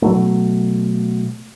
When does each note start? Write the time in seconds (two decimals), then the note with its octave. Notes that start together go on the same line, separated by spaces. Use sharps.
0.02 B2 F#3 A3